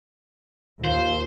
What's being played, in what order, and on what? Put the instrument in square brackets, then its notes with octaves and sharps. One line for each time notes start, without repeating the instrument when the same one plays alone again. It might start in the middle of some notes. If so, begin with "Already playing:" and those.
[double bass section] D#2 [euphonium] F4 [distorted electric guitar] C5